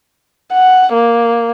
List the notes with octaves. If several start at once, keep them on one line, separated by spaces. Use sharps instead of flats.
F#5
A#3